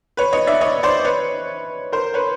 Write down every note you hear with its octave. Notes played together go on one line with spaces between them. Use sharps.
B4 C#5
C#5 D#5
D5 E5
C#5 D#5
C5 D5
B4 C#5
A#4 C5
B4 C#5